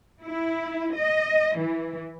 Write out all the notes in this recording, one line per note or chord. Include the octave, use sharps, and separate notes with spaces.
E4
D#5
E3